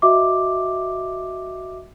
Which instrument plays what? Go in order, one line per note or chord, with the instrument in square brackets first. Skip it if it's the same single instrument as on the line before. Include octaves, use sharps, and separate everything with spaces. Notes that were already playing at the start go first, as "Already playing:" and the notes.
[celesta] F#4 D#5 E5 D6